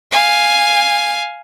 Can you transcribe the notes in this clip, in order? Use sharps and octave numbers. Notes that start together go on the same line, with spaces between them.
F5 G#5